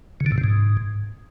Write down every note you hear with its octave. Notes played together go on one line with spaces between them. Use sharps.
C#3
D3
A2
C3
G#2